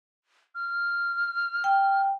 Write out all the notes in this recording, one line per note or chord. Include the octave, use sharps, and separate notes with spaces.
F6
G5